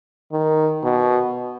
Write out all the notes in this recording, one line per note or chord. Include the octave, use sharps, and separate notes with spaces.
D#3
B2